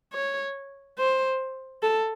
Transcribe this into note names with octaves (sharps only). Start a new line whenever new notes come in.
C#5
C5
A4